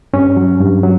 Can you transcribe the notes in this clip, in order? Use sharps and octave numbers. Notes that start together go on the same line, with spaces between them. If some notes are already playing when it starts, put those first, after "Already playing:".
G2 C#4
F#3
G2
F#3